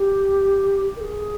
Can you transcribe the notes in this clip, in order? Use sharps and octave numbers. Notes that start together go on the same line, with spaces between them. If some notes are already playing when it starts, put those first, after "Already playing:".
Already playing: G4
A#4
G#4